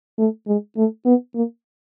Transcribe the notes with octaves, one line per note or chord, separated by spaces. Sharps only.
A3
G#3
A3
B3
A#3